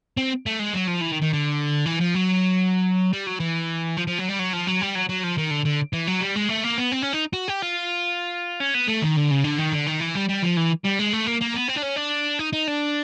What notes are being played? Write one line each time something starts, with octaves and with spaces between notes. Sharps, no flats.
C4
A3
G#3
F#3
F3
E3
D#3
D#3
D3
E3
F3
F#3
G3
F#3
E3
F3
F3
F#3
G3
F#3
F3
F#3
G3
F#3
F#3
F3
D#3
D3
D3
E3
F#3
G3
G#3
A3
A#3
B3
C4
C#4
D#4
F#4
G4
F4
C#4
B3
A3
D#3
D3
C#3
D3
D#3
D3
D#3
E3
G3
G3
F3
E3
G3
G#3
A3
A#3
A#3
B3
C4
D4
C#4
D4
D#4
D#4
D4